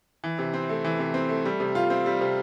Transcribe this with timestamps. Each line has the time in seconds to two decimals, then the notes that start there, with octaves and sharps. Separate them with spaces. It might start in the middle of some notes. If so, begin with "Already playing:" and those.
0.24 E3
0.39 C3
0.54 C4
0.69 A3
0.85 E3
0.99 C3
1.14 C4
1.29 A3
1.45 G3
1.60 C3
1.75 F4
1.90 C4
2.06 G3
2.21 C3